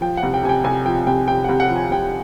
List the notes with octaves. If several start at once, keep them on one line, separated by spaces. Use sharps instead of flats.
F3 G5
F#5
C2
G5
C3 G#5
G5
C2 G#5
F3 G5
C2 G5
C3 G5
C2 F#5
F#5
F3
G#5
C2 G5